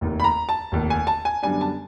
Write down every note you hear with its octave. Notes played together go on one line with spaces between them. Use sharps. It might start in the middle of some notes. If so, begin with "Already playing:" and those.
F1 D#2 D#3
B5
A#5
A5
F1 D#2 D#3
G#5
A5
G#5
F#2 D3 G3 B3 D4 G#5
A5